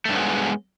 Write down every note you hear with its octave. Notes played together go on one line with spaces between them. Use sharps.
G2 F#3 G#3 A3 B3